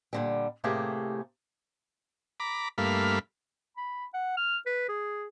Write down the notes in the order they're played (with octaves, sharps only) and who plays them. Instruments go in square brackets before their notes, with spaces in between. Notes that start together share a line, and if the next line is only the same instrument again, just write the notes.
[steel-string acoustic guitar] A#2 D3 G3
A2 C3 A3 A#3 G4 G#4
[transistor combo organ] A#5 B5 D6
G2 A3 A#3 F5 B5
[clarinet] B5
F#5
F6
B4
G#4